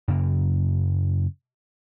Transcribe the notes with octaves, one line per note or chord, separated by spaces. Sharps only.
F#2 C#3 A#3